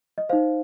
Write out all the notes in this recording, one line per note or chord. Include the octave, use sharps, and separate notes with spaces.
D#5
D#4 C5 F5